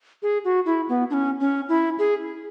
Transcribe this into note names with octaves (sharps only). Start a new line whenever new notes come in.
G#4
F#4
E4
B3
D4
C#4
C#4
E4
G#4